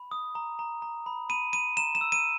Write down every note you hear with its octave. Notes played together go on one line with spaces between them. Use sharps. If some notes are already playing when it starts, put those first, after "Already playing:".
Already playing: B5
D#6
A#5
A#5
A#5
B5
B5 D#7
B5 D#7
A#5 E7
E7
E6
D#7